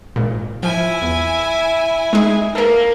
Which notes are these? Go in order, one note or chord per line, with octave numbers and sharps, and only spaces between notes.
G#1 A#2
F3 E4 G#5
E2
G#3 D#4 G#4
A#3 A4 A#4